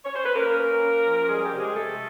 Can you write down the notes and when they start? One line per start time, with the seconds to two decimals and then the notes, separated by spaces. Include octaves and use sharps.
0.05 C#5
0.15 C5
0.25 B4
0.35 A#3 C#4 A#4
0.59 C#4
0.82 C#4
1.06 F3
1.29 G3 G#3 G#4
1.44 G3 G4
1.53 C3
1.60 G#3 G#4
1.76 G#3 A3 A4